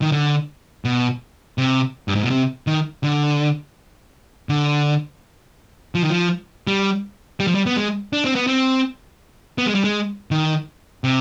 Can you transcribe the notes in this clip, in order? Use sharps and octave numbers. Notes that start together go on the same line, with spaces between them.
D#3
D3
B2
C3
G2
G#2
B2
C3
D#3
D3
D3
F3
D#3
F3
G3
G3
F3
G3
B3
G#3
D4
C4
B3
C4
B3
G#3
G3
G#3
D#3
C3